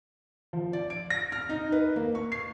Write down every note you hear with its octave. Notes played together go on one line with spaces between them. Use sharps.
F3
D5
D7
A#6
F6
D#4
B4
A#3
C#6
C7